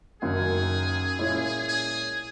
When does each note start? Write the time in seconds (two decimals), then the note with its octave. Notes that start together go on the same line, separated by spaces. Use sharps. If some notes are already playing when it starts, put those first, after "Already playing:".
0.22 F#1 F#2 D#3 G#4
1.19 A#2 G#3 C#4 E4
1.68 G#4